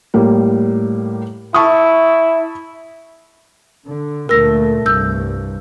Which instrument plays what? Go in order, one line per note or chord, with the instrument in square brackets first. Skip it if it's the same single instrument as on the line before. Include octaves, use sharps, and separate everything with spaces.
[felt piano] A2 G3 A#3
[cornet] E4 [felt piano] A5 C#6 D#6
[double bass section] D3
[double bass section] D2 A#2 A3 [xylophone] A#4 E6 A#6
[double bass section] C2 G2 [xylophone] E6 G6